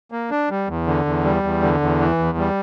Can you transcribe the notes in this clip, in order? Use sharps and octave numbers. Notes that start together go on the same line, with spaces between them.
A#3
D4
G3
E2
D3
E2
G3
E2
D3
E2
E3
E2
G3